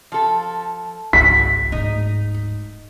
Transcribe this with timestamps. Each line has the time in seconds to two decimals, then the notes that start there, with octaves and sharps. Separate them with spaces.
0.12 F3 A4
1.13 G#1 C#2 F#4 B6
1.72 D1 G#2 D#4